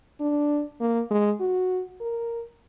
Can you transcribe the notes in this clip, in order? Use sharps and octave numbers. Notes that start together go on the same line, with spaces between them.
D4
A#3
G#3
F#4
A#4